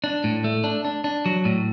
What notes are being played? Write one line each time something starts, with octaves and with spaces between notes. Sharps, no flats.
D4
A2
A3
D4
D4
D4
F#3
A2